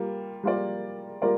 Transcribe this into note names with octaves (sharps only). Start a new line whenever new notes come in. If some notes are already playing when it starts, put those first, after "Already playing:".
Already playing: G3 A#3 F4
G3 A#3 F4 A#4 D5
G3 A#3 F4 A#4 D5